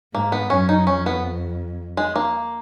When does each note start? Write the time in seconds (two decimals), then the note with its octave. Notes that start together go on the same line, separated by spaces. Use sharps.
0.14 G#2 A#3
0.32 B3
0.50 F#2 C#4
0.69 D#4
0.87 F2 C#4
1.06 B3
1.97 G#3
2.16 A#3